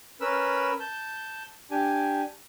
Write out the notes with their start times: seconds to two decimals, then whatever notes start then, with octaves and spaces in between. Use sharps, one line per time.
0.21 C#4 A#4 B4 B5 E6
0.80 A5 G6
1.71 D4 G4 G#5